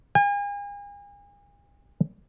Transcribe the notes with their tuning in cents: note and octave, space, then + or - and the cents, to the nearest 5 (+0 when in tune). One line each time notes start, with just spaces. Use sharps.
G#5 -40